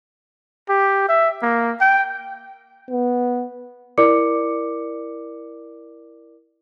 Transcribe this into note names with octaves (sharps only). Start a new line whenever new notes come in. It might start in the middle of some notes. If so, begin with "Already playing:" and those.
G4
E5
A#3
G5
B3
E4 A#4 D5 D6 C#7